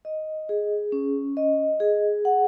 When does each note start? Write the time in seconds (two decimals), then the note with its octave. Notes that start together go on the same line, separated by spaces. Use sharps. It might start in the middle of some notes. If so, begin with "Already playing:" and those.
0.05 D#5
0.49 G#4
0.92 C#4
1.37 D#5
1.80 G#4
2.25 F#5